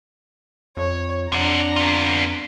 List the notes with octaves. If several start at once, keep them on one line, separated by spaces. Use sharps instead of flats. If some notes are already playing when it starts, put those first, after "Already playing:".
F2 C#5
F2 C3 D4 F#5 A#5
B3 F4